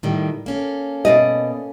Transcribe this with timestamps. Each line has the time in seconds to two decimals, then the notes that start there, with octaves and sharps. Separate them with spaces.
0.03 A2 D#3 G3
0.46 A#3 C#4 A4
1.05 B2 D5 D#5